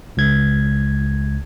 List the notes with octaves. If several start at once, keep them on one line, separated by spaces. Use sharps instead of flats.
C#2 G#6